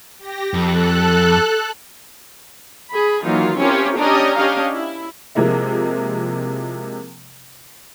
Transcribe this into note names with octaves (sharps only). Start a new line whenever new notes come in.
G4 A#6
F2 A4 F#6
G#4 B5
D#3 E3 F#3 A#3 D#4 F4
C4 C#4 E4 F4 G4 A#4
C#4 D4 G4 D5 D#5 A#5
C#4 D4 G4 D#5 F5
E4
C3 F3 G#3 A#3 E4